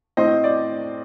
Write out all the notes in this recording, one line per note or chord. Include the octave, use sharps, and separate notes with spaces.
A2 A3 C4 C5 D#5
D5